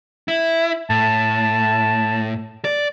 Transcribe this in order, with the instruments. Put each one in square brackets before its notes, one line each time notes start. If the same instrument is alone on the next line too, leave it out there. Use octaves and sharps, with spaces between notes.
[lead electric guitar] E4
[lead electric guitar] A2 [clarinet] A5
[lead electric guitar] D5